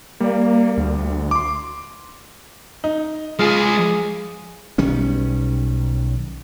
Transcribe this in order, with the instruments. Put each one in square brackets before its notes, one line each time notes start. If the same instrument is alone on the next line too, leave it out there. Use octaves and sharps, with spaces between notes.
[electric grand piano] G3 D5 [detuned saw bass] A#3
[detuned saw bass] D2
[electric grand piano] C6 D6
[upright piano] D#4
[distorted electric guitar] G#3 F5 [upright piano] F4 [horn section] G#4
[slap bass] B1 D#3 G3 C#4